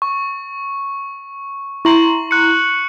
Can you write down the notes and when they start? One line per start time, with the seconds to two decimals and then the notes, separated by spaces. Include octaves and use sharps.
0.02 C#6
1.85 E4 A#5 C6 C#6 F#7
2.31 F#6 C#7